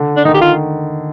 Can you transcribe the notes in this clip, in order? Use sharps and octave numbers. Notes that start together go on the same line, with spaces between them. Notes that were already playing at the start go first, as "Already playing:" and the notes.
Already playing: D3
D4
D#3 D#4
G4
F4